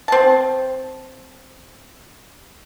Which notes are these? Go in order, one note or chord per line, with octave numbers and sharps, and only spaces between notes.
C4 A5